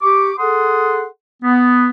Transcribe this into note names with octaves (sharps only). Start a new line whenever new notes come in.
G4 C#6 D6
G#4 A4 F#5 C6 D#6
B3